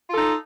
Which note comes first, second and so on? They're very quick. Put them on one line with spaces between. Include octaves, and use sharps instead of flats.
F4 A4 D#4